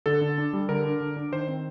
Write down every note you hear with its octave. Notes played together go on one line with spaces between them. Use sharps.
D3 A4
D3
D4
G3
D3 A#4
D4
D3
D4
D#3 C5
C4